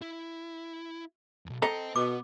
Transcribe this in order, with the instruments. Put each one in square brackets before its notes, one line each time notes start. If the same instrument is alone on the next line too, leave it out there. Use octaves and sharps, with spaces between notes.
[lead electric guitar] E4
B1 E2
[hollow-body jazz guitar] A4 D#5 A#5 [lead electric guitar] C5 G5
[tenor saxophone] B2 [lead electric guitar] B3 [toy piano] D6